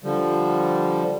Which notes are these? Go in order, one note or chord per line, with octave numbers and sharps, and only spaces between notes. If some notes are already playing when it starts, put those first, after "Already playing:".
D3 F3 G3